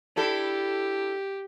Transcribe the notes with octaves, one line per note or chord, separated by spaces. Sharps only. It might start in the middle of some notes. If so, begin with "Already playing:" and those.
D4 E4 G4 A4